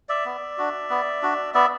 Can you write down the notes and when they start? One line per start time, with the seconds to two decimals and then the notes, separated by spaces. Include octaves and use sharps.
0.09 D5 E5
0.26 B3
0.58 D4 F#4
0.90 B3
1.23 D4 F#4
1.54 B3 D5 E5